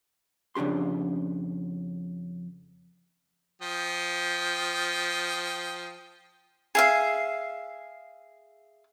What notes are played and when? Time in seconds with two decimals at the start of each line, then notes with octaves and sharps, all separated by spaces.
0.55 F2 C#3 D4 G4 C6
3.62 F3 G5 D#6
6.75 G#4 E5 F5